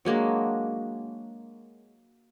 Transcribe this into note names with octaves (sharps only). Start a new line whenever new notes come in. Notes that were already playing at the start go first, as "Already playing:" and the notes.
F#3 G#3 A#3 D4